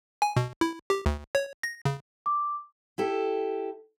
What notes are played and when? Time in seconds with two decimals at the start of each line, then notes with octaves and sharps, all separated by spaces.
0.22 G#5
0.36 B2
0.61 E4
0.90 G4
1.06 D2
1.35 C#5
1.63 A#6
1.85 C#3
2.26 D6
2.98 E4 G4 A4